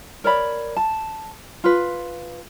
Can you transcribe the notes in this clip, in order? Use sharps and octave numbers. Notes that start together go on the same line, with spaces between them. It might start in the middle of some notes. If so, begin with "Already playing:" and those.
A#4 C#5 D5 B5
A5
F4 B4